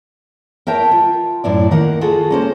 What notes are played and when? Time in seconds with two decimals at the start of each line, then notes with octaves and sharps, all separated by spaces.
0.67 A#4 C#5 E5 G5 A5
0.91 F4
1.44 F#2 A2 E4 D5
1.71 D#3 A#3 A#4 F#5
2.01 F4 F#4 G#4 A4
2.30 A#3 C#4 C5